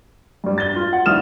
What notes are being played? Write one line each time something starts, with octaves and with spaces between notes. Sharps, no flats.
G2 G3
A6 G7
F4
F#5
G#1 G2 E4 D#6 F6 E7